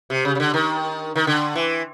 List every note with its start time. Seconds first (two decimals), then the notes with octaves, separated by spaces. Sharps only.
0.10 C3
0.25 C#3
0.35 C#3
0.40 D3
0.54 D#3
1.15 D#3
1.27 D3
1.55 E3